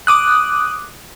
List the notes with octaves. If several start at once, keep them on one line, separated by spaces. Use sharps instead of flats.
D6 D#6 F#6